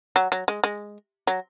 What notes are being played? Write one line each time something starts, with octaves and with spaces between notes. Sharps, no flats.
F#3
F#3
G#3
G#3
F#3